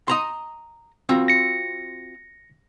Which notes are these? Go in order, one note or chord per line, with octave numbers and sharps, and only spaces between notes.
D#5 A#5 C6
C4 F4 F#4
A#6 C#7